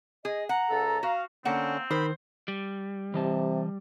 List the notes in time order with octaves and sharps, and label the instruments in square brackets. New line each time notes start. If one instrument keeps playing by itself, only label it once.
[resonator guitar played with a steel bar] G#4 [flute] D#5
[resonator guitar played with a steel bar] F#5 [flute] A#5
[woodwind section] C#2 A4
[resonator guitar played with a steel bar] F#4 [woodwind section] F5
[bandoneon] D3 C#4 [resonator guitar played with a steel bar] A#3 F#5 [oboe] C4
[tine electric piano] D#3 [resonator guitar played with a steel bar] C5 [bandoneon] B5
[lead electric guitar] G3
[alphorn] C3 [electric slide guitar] E3 D#5 A5